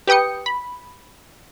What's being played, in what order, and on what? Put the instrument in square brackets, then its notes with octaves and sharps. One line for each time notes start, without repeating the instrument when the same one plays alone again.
[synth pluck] G4 B4 G5 D#6 C#7
B5